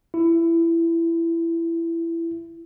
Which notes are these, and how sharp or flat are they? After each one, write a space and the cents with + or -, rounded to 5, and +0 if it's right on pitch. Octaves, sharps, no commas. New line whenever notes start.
E4 +20